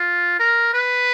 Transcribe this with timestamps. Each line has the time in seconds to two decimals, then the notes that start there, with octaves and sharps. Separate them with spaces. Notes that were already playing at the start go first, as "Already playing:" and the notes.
Already playing: F4
0.40 A#4
0.74 B4